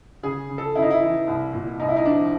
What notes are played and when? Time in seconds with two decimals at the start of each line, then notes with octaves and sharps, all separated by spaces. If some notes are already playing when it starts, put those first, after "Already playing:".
0.23 C#3 G#4
0.49 C#3
0.58 A4
0.75 C#3 E4
0.82 D#4
0.91 E4
1.02 E3
1.28 C2
1.53 A#2
1.80 C2 D#4
1.89 E4
1.96 D#4
2.05 F3 D4